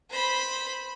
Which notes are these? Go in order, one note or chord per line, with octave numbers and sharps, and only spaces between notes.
C5 B5